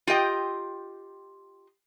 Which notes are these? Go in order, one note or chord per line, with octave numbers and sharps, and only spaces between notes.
F4 G4 D#5 G5